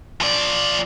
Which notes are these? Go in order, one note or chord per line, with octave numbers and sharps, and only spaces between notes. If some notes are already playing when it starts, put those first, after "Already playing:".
F3 D5